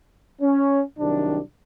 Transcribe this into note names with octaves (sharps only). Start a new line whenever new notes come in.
C#4
C2 C3 D#3 F#3 D4